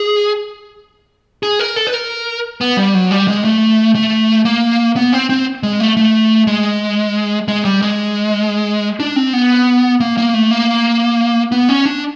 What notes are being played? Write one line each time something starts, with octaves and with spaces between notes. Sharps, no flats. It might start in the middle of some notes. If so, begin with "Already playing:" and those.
Already playing: G#4
G#4
A#4
A4
B4
A#4
B3
G3
F#3
G3
G#3
A3
A3
A#3
B3
C4
C4
G#3
A3
A3
G#3
G#3
G3
G#3
D4
C4
B3
A#3
A#3
A3
A#3
B3
C#4
D4